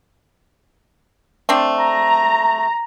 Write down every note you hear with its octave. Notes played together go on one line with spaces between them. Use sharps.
A3 C4 D4
A#5